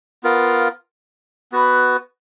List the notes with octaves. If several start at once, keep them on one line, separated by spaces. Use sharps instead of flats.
B3 F4 A#4 F5
B3 F#4 B4